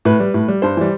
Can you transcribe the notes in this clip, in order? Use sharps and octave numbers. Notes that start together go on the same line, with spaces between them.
A2 B4
G3
A2
G3
G2 C5
E3 G3